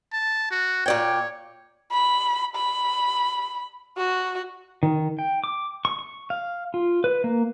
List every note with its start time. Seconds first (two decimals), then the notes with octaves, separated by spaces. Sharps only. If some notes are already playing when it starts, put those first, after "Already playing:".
0.13 A5
0.51 F#4
0.86 A#2 C#5 D5 G5
1.91 B5
2.56 B5
3.97 F#4
4.83 D#3
5.19 G5
5.44 D6
5.85 C#6
5.99 C#6
6.30 F5
6.74 F4
7.04 B4
7.24 A#3